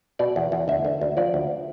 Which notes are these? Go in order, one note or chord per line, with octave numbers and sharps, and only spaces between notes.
B2 D5
E2
E2
D2 E5
D3
D2
F3 D5
D2